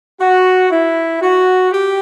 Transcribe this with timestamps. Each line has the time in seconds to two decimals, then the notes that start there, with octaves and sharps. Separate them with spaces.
0.20 F#4
0.71 E4
1.22 F#4
1.72 G4